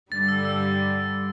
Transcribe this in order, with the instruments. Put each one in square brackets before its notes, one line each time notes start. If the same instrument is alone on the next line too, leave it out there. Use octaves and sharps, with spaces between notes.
[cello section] G2 D3 G3 [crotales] A6
[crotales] E6
E6